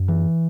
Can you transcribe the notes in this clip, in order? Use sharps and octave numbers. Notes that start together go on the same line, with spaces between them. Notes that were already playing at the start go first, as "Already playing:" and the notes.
Already playing: F#2
E3